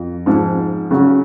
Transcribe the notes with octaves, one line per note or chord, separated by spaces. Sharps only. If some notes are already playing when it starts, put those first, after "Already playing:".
Already playing: F2
G#2 F3 G#3
C#3 F#3 C#4